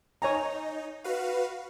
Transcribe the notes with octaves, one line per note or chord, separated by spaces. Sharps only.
D#4 C#5 G#5 A#5
F#4 B4 F5